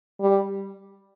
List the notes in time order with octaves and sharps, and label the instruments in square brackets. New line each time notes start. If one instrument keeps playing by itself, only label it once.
[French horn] G3